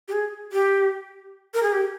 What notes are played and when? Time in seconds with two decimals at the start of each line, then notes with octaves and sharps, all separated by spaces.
0.08 G4
0.13 G#4
0.52 G4
1.54 A#4
1.63 G#4
1.72 G4